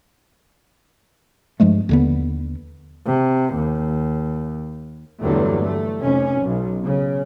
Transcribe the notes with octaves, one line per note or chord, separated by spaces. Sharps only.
G2 F3 G#3 A3
D#2 D3 B3
C3
D#2
E2 G2 D3 F#3 A3
A3
F1 C#4
B1
C#3